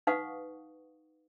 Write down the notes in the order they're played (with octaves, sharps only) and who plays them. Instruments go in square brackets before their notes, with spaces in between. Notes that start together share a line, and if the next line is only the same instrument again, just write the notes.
[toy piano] D#4 B4 F5 F#5 C#6 D#6